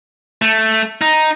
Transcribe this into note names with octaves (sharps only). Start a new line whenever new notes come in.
A3
D#4